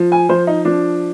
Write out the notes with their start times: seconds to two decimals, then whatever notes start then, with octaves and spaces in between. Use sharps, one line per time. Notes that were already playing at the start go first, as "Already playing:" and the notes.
Already playing: F3
0.12 G#5
0.29 F3 C5
0.47 D#4
0.65 F3 D4